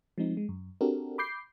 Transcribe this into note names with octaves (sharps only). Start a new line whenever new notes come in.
F3 G#3 C4 D#4
G#3
F#2
C4 D4 F#4 G4 A4 A#4
B5 D6 G6 C7